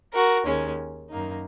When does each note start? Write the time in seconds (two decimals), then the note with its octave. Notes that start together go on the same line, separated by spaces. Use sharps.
0.14 F#4 A#4
0.46 D#2 D#3 G#3 C#4
1.10 F#2 D#3 A#3 D#4